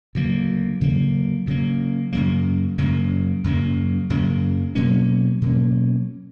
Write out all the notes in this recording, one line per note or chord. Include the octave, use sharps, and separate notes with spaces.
D2 C#3 F#3 A#3
D2 C#3 F#3 A#3
D2 C#3 F#3 A#3
F#2 C#3 F#3 A#3
F#2 C#3 F#3 A#3
F#2 C#3 F#3 A#3
F#2 C#3 F#3 A#3
B2 F#3 A#3 C#4
B2 F#3 A#3 C#4